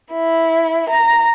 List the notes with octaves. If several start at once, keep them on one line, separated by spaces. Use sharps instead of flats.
E4
A#5